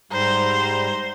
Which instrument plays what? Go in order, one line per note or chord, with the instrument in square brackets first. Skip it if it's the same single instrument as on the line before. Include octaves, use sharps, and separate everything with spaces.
[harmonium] G#2 G3 A#5 [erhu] C5